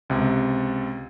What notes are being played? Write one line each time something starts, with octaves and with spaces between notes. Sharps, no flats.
C#2 C3